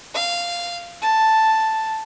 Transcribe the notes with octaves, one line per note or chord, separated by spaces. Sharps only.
F5
A5